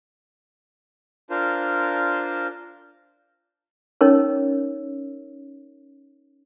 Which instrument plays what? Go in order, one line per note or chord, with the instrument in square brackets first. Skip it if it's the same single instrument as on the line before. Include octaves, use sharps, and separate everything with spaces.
[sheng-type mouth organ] D4 F4 A#4 C5
[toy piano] C#4 D#4 A#4 C#5